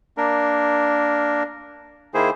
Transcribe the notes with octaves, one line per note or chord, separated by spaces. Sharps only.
A#3 D4 A#4
D#3 A#3 E4 G#4 C5